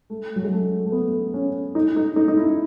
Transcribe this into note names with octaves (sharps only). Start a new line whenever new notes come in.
A3
F#3
G#3
A3
A3
B3
C#4
D#4
D#4
D#4
D#4
E4